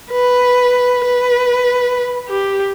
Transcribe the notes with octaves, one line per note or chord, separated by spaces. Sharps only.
B4
B4
G4